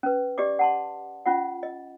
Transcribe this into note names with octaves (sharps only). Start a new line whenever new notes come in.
C#4 B4
G4 D5 D#5 D6
F#5 A5 C6
C#4 F4 F#5
D#5